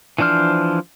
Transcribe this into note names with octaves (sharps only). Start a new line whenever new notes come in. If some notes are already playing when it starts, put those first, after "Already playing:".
E3 F3 D4 C5 F6